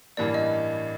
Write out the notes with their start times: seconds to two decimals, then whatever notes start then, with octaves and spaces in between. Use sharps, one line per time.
0.17 A1 G2 E3 G3 A#3 D5
0.34 D#5